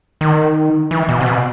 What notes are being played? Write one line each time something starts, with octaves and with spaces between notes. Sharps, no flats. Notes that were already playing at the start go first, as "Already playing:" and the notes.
D#3
E3
B2
C3
B2